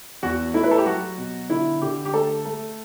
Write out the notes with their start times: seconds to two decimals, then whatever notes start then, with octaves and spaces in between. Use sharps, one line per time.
0.23 E2 F#4
0.54 A3 E4
0.64 B4
0.71 A4
0.78 G4
0.86 F#3 F#4
1.18 B2
1.50 D3 E4
1.81 D3 G4
2.05 G4
2.14 A3 A4
2.45 A3